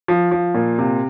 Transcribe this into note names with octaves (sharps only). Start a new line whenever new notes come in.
F3
F3
A#2
C3